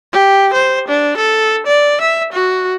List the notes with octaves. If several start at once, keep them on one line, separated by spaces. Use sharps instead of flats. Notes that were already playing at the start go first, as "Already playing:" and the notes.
G4
C5
D4
A4
D5
E5
F#4